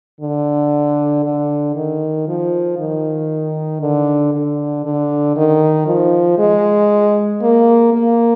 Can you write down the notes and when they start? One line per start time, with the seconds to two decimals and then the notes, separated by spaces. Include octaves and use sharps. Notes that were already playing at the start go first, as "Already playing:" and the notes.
0.21 D3
1.25 D3
1.75 D#3
2.28 F3
2.79 D#3
3.81 D3
4.34 D3
4.85 D3
5.36 D#3
5.87 F3
6.38 G#3
7.42 A#3
7.93 A#3